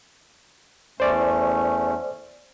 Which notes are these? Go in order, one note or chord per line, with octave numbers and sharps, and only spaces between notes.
E2 A3 C#4 C5 D5